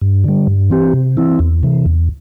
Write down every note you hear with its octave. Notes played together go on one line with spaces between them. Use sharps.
G2
D3 G3
G2
E3 C4 G4
C3
E3 C4 E4
E2
C3 E3
E2